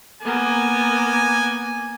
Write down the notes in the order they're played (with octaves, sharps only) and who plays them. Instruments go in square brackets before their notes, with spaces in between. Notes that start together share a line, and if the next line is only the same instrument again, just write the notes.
[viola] A#3 B3 [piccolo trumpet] G#5